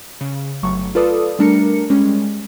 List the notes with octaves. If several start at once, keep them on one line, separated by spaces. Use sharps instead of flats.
C#3
G1 F#3 A3 C#6
F4 A4 B4 D5 D#6
G3 A3 D4 A#4 C#7
G3 G#3 C#4